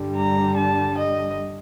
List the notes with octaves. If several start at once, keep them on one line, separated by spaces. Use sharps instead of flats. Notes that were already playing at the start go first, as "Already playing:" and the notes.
Already playing: G2 D3 G3
A#5
A5
D#5